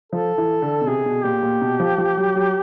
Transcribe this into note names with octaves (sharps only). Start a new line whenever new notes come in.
F3 A4
E3
D3
B2
C3 G#4
B2
A#2 G4
A#2
B2
F3
F3
F#3
F#3